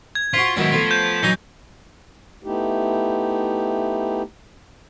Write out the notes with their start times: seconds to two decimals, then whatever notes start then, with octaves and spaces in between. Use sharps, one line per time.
0.15 G#6
0.34 F4 F#4 C5 B6 D7
0.57 G#2 D#3 F#3 B3 E4
0.72 F3 A3 B3 F4
0.91 G6
1.23 E3 F#3 D#4 G#5
2.44 A3 B3 D#4 E4 G4